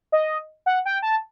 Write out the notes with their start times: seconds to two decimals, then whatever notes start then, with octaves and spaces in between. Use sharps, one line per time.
0.12 D#5
0.66 F#5
0.85 G5
1.02 A5